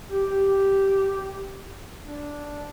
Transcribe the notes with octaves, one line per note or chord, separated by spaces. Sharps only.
G4
G4
D4